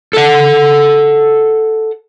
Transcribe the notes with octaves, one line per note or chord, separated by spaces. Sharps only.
A4 F#5